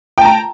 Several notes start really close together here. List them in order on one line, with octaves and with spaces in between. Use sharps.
G5 A5 A#5